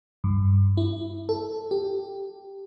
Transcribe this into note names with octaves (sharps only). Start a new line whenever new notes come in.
G2
E4
A4
G4